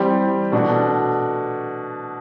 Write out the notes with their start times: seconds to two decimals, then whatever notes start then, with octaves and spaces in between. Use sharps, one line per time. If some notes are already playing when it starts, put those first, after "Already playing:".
Already playing: E3 G3 C4 G4
0.52 B2 A3 D4 F#4 A4